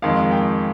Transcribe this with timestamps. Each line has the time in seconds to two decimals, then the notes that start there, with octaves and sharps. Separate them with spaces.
0.02 F2 D#3 G#3 F5
0.31 G5